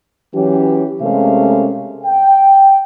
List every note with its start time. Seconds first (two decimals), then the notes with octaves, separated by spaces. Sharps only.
0.34 E3 F#3 C#4 G4
1.01 C3 G#3 A3 C#4 A#4 F5
2.04 G5